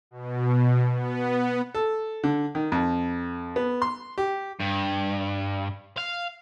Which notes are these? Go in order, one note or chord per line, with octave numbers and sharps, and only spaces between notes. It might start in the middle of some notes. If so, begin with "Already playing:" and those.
B2
B3
A4
D3
D#3
F2
B3
C6
G4
G2
F5